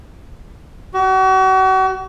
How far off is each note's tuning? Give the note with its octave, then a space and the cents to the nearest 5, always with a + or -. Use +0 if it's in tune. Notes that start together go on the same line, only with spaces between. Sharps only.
F#4 +40